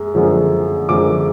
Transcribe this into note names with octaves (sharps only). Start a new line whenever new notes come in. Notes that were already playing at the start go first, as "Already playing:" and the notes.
Already playing: F#2 G#3
F#2 D3 F3 G#3
F#2 D3 F3 G#3 D6